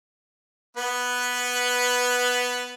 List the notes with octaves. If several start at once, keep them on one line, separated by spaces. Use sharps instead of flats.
B3 B4